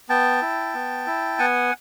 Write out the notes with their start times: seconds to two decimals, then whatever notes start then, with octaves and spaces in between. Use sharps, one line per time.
0.09 B3 G5 A5
0.42 E4
0.74 B3
1.07 E4
1.39 B3 F#5 G#5